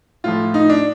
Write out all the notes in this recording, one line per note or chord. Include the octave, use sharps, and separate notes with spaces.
A2 F3 F4
D#4
D4